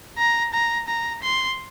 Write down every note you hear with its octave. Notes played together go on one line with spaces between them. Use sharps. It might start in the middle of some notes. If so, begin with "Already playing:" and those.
A#5
A#5
A#5
C6